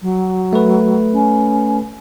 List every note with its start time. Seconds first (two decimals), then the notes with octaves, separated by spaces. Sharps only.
0.02 F#3
0.53 A3 B4
1.13 C#4